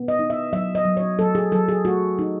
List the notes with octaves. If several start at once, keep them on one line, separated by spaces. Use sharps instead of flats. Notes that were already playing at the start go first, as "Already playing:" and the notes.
Already playing: B2 B3
D#5
D#4
E5
F#3 E5
D#5
F#3
C#5
F#3 A4
G#4
F#3 A4
G#4
A3 F#4
D#4